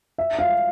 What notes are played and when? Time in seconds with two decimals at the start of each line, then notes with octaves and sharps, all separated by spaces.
0.18 E5
0.39 F5